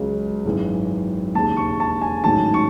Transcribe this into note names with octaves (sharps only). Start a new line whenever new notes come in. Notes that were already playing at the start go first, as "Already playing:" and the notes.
Already playing: C#2 C#3 F#3
G#1 F#2 E3 G#3
E1 D#2 C#3 A5
C#6
A5
G#5
A1 G#2 D#3 F#3 A5
C#6